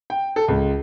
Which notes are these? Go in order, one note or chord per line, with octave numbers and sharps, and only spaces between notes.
G5
A4
C#2